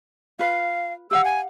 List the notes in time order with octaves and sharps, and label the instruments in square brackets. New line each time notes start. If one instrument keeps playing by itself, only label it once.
[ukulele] F4 B4 [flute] F5
[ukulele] G4 F5 F#5 [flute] E6
[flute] G#5